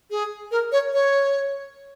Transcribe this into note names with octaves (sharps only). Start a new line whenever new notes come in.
G#4
A#4
C#5
C#5